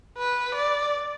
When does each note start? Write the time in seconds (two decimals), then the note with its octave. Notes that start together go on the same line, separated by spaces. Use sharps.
0.18 B4
0.55 D5